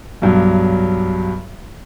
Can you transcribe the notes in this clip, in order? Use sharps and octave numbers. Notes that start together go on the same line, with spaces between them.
B1 G2 F#3